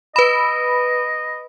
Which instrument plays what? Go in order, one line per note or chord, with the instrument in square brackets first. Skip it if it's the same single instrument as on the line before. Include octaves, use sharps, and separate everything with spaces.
[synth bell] B4 B5 [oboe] D#5